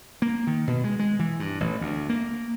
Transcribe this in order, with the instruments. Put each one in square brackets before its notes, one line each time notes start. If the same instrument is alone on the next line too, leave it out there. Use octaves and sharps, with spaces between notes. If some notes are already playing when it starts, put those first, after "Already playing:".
[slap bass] A#3
D#3
B2
G#3
G#3
E3
G2
A1
D2
A#3